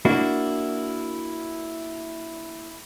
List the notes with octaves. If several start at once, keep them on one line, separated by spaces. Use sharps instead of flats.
A#3 D4 E4 F#4